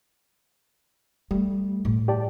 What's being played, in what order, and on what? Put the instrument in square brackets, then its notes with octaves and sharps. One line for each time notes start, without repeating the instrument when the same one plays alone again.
[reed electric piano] G3 [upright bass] A3
[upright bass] A2
[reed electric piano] G4 D5 A5